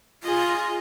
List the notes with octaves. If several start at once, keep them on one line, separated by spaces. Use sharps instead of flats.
F4 G#4 D#5